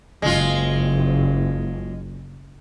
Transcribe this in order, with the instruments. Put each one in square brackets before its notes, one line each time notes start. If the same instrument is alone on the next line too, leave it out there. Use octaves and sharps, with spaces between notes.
[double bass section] F#1 [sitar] G#3 F4